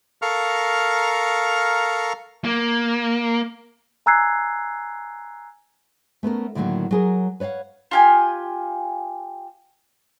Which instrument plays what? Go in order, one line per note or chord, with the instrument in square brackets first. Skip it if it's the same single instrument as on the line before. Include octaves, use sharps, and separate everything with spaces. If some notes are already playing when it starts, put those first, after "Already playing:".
[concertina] A4 A#4 F5 A#5 C#6 F6
[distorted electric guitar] A#3
[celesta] G#5 A#5 E6 F#6 G#6 C7
[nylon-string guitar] A3 B3 C#4 A#4
A2 D3 D#3 F#3 A#3 F#4
F#3 G#4 A#4
B4 C#5 D5 F5 F#5
[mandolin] F4 G4 G#5